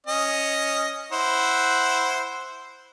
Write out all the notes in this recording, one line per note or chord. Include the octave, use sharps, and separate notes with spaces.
C#4 D#5
E4 C5 F#5